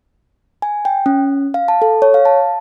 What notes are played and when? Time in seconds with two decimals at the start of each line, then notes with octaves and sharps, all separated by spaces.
0.62 G#5
0.85 G5
1.06 C#4
1.54 F5
1.68 A5
1.82 A4
2.02 C#5
2.14 F5
2.25 A5